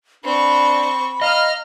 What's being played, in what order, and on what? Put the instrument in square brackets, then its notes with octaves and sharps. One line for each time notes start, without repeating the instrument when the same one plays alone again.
[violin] C4 C#6 [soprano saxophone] D4 [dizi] B5
[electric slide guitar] D#5 [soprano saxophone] F5 [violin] A#5 F6